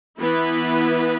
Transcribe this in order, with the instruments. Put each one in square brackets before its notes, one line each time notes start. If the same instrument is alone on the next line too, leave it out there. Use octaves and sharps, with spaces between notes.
[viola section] E3 B3 E4 B4